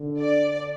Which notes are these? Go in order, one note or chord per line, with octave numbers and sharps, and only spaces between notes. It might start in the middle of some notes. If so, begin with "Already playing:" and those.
Already playing: D3
D5